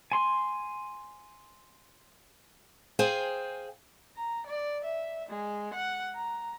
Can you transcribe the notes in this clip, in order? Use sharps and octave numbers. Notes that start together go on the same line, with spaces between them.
G#5 C6
G#4 C5 F5 G5 G#5
A#5
D5
E5
G#3
F#5
A#5